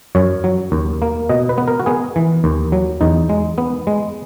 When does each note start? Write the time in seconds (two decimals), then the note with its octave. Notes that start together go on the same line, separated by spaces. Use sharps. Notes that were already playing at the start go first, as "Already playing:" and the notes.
0.15 F#2 C#5
0.44 F#3
0.72 D#2
1.02 A#3
1.29 B2 D#5
1.49 B4
1.58 B3
1.68 A#4
1.80 F#4
1.86 B3 G#4
2.16 E3
2.44 D#2
2.72 F#3
3.01 E2 D#4
3.29 G#3
3.58 B3
3.87 G#3